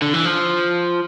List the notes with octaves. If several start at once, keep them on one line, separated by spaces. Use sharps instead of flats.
D3
E3
F3